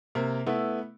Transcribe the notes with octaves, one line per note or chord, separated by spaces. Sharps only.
C3 A#3
A3 B3 E4